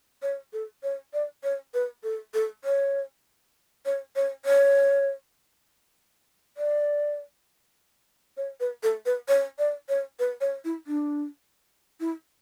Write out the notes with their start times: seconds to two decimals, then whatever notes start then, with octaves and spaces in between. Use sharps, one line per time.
0.22 C#5
0.53 A4
0.83 C#5
1.13 D5
1.43 C#5
1.74 B4
2.03 A4
2.34 A4
2.64 C#5
3.86 C#5
4.16 C#5
4.45 C#5
6.57 D5
8.37 C#5
8.60 B4
8.83 A4
9.06 B4
9.28 C#5
9.59 D5
9.89 C#5
10.19 B4
10.41 C#5
10.65 E4
10.87 D4
12.00 E4